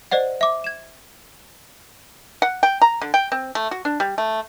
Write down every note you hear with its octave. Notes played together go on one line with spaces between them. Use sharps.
C5 D5 D#5 F#5
E5 D6
G#6 E7
F#5
G5
A#5
D3
G5
C4
A3
F#4
D4
G3
A3